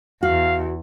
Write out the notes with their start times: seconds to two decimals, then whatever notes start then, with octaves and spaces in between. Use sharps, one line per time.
0.23 E2 F#4 F5